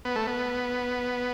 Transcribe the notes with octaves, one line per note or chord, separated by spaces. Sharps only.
B3
A3
B3